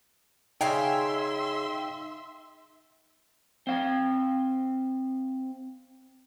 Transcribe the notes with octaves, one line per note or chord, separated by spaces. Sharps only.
C#3 D#4 E5 F5 G5 G#5 C6
C4 F5